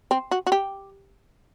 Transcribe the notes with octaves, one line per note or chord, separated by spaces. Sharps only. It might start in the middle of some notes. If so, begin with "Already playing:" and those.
C4
F#4
F#4
G4